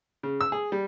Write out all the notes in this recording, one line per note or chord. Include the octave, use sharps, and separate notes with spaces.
C#3
E6
G#4
G3